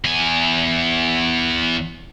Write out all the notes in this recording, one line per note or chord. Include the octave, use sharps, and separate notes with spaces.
E2 G#5